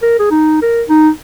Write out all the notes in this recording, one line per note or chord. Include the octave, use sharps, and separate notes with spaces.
A#4
G#4
D#4
A#4
D#4